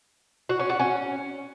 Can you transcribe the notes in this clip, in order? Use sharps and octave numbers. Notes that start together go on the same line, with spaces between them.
F#4
C#4
F#4
C#4